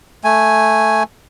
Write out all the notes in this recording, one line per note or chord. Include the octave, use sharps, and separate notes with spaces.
A3 G#5